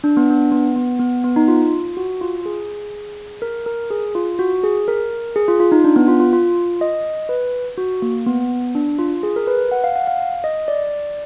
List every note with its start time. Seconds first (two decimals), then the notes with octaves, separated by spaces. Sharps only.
0.04 D4
0.17 B3
0.31 D4
0.52 B3
0.76 B3
1.00 B3
1.24 B3
1.36 D#4
1.48 F4
1.97 F#4
2.21 F4
2.46 G#4
3.42 A#4
3.66 A#4
3.90 G#4
4.15 F4
4.39 F#4
4.64 G#4
4.88 A#4
5.36 G#4
5.48 F4
5.60 F4
5.72 D#4
5.84 D4
5.96 B3
6.08 F4
6.20 F4
6.33 F4
6.81 D#5
7.29 B4
7.78 F#4
8.02 A#3
8.26 B3
8.75 D4
8.99 F4
9.23 G#4
9.36 A#4
9.47 B4
9.72 F#5
9.84 F5
9.96 F#5
10.07 F5
10.44 D#5
10.68 D5